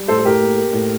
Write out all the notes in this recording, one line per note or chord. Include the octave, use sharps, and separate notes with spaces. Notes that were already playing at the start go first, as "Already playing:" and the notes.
Already playing: G3
A2 A4 C5
A4
A2 G4 A#4
A#3
A#3
A2